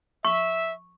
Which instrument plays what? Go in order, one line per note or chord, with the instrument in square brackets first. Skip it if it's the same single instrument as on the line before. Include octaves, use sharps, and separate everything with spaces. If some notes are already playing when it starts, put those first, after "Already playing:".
[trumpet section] E5 [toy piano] C#6